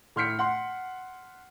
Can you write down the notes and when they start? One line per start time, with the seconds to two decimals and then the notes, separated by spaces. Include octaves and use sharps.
0.16 A2 C6 F6 G6 B6 C#7
0.39 F#5 C6